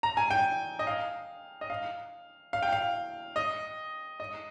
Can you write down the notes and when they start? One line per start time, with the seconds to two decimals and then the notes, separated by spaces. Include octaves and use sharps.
0.03 A#5
0.17 G#5
0.31 G5
0.79 D#5
0.87 F5
1.61 D#5
1.70 F5
2.53 F5
2.63 G5
2.73 F5
3.36 D#5
4.20 D#5